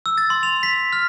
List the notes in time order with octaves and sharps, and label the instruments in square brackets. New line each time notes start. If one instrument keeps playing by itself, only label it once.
[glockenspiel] E6
A6
C6
F7
B6
F6